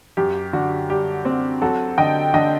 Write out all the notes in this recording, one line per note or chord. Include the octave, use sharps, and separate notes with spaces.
F#2 G4
D3 F#4
G3 G4
C4
F#3 F#4 A4
D3 D#5 G5
D3 D#5 G5